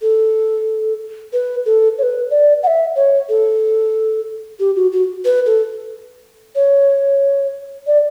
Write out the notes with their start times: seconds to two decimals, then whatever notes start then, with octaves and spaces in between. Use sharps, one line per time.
0.02 A4
1.33 B4
1.66 A4
1.98 C#5
2.03 B4
2.31 D5
2.63 F#5
2.67 E5
2.96 C#5
3.29 A4
4.59 G4
4.76 F#4
4.92 F#4
5.25 B4
5.46 A4
6.55 C#5
7.87 D5